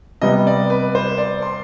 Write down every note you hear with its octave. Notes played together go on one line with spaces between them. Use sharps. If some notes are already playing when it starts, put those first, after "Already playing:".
C3 G3 B3 D#5
D5
B4
C5
D5
C6